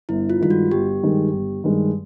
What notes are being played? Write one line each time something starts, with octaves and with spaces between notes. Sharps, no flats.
G1 E4
F4
G2 D#3 G#3 F4
F#4
G1 G4
G2 D#3 G#3
G1
G2 D#3 G#3